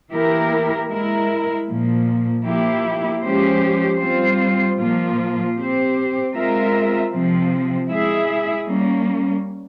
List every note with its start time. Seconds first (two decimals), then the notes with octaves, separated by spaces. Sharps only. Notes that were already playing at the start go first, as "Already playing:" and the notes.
0.11 E3 A#3 E4 G4 A#4
0.88 G#3 E4 A#4
1.67 A#2 F3 A#3
2.45 F3 A#3 E4 G4
3.22 F3 G#3 C#4 G4 C5
4.00 G3 C4 F4 C5
4.78 A#2 F3 A#3 F4
5.56 C4 G4 C5
6.34 G#3 C4 F4 A#4 E5
7.12 C3 F3 C4
7.90 G#3 E4 G#4 E5
8.68 G3 A#3 C#4